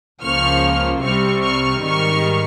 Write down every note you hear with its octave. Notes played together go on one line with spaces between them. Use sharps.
C#2 C#3 F3 A#3 C#6 F6
C2 C3 G3 C4 C#6 F6
C#6 F6
G#2 D#3 G3 C#6 F6